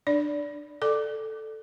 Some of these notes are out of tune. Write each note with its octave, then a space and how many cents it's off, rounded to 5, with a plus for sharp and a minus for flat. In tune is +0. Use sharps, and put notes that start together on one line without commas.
D4 +20 D5 -20
A4 +0 D5 +15 D6 +0